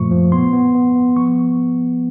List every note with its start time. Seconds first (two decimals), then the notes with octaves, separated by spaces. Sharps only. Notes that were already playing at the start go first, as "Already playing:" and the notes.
Already playing: F#2 A#2 F3 A3 C#6
0.11 F3
0.32 B3 C6
0.53 B3
0.75 B3
0.96 B3
1.16 F3 C#6